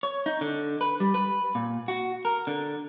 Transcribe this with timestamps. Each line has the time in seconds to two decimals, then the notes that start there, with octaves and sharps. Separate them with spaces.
0.03 C#5
0.26 D#4
0.41 D3
0.81 B4
1.00 G3
1.14 B4
1.55 A#2
1.88 F#4
2.25 A#4
2.47 D3